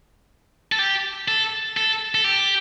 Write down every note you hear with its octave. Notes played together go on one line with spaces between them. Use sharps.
A4
G4
A4
A4
A4
G4